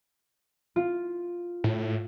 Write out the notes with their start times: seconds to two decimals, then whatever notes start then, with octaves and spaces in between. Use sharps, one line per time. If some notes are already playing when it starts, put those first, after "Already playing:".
0.76 F4
1.64 A2